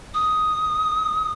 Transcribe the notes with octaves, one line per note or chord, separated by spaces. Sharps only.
D#6